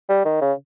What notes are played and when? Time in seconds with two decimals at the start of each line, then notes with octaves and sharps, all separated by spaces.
0.09 G3
0.25 D#3
0.41 C#3